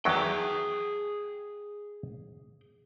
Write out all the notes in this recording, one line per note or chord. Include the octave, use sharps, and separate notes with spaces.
E2 D#3 F#3 G#4 G5